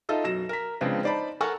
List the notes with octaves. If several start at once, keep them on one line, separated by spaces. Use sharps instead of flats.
D#4 F4 A4 D#5 E5
F#2 B2 A#6 E7
A#4 B6
C#3 F3 G#3 B3 C4 D4
D#4 C5 D5 A5 B5
A4 A#4 F#5 G#5 A5 C#6